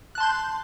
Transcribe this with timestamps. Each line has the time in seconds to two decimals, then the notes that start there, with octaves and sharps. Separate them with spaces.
0.15 F#6
0.18 A5
0.20 C6
0.23 G6